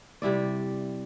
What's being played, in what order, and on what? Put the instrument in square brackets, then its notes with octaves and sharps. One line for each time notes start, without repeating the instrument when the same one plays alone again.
[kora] C3 G3 E4 D5